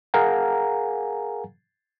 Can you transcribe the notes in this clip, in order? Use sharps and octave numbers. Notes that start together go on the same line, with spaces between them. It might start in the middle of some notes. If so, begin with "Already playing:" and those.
G#4 A#4 F5 F#5 G#5 A#5